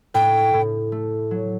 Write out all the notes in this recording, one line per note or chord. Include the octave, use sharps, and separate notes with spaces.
A2 G5
A2
A3
F#3